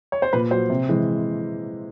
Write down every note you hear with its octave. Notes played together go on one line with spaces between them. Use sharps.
C#5
C5
A#2 B4
F#3 C5
C3
E3 G#3